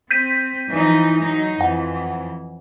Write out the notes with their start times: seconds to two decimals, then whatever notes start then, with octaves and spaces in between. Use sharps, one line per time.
0.11 C4 G6 B6 D#7
0.69 E3 F3 D#4
1.18 F#3 D#4
1.61 F2 E3 F#5